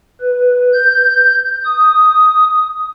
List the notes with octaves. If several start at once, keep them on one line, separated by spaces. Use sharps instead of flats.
B4
G6
D#6